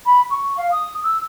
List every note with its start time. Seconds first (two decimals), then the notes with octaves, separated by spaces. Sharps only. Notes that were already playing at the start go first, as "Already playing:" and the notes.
0.06 B5
0.30 C#6
0.57 F5
0.72 D#6
1.03 E6